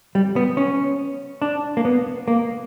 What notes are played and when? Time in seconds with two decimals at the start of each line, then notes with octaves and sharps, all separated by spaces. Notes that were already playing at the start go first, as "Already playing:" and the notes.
0.15 G3
0.36 B3
0.57 C#4
1.42 D4
1.77 A#3
1.85 B3
2.28 A#3